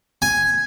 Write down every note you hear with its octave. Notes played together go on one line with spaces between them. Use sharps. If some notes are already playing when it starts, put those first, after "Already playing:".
G#5